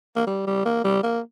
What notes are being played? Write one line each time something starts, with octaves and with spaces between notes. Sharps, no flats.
A#3
G3
G3
A#3
G3
A#3